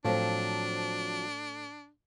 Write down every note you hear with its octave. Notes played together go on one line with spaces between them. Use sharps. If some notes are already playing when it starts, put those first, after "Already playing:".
A2 F3 F#3 C4 D4